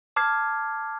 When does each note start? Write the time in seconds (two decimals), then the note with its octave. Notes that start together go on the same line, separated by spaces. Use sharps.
0.16 A5 D6 F6 G#6 C7